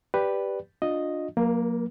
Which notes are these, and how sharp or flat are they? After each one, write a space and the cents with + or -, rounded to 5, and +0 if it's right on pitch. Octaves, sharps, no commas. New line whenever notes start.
G4 +0 B4 +0 D5 +0
D4 +0 F4 +30 D#5 +0
F#3 -40 A#3 +0 A#4 +45